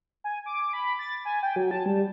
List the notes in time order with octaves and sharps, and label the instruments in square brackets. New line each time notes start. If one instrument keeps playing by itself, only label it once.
[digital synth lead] G#5
D6
B5
A6
G#5
G5
F#3
A5
G3